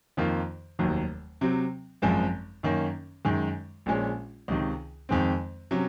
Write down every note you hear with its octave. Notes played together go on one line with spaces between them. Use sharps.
F2 D#3 A#3 F4
F1 D#2 D#3 F#3
C3 F#3 C4
G#1 F#2 F3 G#3 C4
F#2 D#3 A#3 C#4
F#2 D#3 G#3
A#1 A#2 G#3 C#4
C#2 C3 D#3
F2 D#3 G#3 C4
C3 F#3 C#4